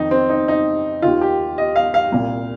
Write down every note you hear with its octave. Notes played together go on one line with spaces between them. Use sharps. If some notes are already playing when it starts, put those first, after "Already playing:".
Already playing: F2 D#3 D#4
C4
D#4
D#4
D#2 D#3 F4
G4
D#5
F5
F5
C2 A#2